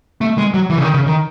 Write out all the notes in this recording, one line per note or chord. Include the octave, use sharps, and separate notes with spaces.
A3
G#3
F#3
E3
C#3
D#3
C#3
D#3